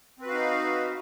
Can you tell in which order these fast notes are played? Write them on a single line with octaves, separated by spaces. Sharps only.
C4 B4 F#4 F5 D#4